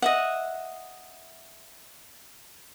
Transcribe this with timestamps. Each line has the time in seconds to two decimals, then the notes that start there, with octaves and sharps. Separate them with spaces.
0.02 D#5 E5 F#5